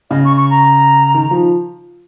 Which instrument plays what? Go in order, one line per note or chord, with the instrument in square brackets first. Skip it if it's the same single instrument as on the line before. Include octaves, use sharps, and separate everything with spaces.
[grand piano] C#3 [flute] D#5
[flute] C#6
C#6
A#5
[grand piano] D#3
F3